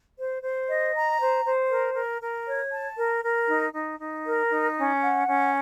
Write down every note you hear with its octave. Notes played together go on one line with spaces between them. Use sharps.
C5
C5
D#5
A#5
C5
C5
A#4
A#4
A#4
C#5
A5
A#4
A#4
D#4
D#4
D#4
A#4
D#4
C#4
F#5
C#4